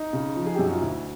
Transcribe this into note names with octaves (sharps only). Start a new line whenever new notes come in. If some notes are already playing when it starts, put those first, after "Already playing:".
Already playing: D#4
C#3
F3
G#4
G4
F#2
F#4
F4
D2 E4